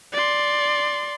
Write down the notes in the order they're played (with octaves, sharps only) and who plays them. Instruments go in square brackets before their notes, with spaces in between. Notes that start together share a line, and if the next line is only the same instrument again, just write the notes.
[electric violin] D5 C6